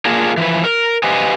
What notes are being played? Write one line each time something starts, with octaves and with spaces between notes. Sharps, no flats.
A#3 D4 F4 G#4 A#4
E3 F3 B4
A#4
G4 B4 C5 D#5 F5 G#5